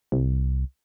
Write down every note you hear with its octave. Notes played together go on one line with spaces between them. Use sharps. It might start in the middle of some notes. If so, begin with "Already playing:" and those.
C2